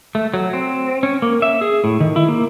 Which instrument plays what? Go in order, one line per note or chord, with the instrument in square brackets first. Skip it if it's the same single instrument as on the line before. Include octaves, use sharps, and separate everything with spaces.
[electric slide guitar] A3
F#3
C4
C#4
A#3
E5
G#4
A2
D#3
E4
A#3